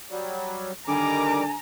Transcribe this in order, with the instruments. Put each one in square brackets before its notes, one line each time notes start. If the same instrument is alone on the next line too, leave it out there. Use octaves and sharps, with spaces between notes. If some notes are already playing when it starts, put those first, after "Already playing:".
[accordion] F#3 G3
[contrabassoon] D3 [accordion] D#3 G3 D6 [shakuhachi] G#5 [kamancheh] A#5